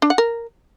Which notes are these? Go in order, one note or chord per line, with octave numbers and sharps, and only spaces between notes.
D4
F#5
A#4